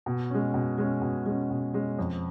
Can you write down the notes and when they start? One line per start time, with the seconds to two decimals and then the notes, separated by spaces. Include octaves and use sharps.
0.06 B2
0.30 G#3 C#4
0.54 B2
0.78 G#3 C#4
1.02 B2
1.26 G#3 C#4
1.50 B2
1.74 G#3 C#4
1.99 F2